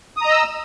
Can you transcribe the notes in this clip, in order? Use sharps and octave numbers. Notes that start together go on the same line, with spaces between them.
D#5 A#5 D#6 E6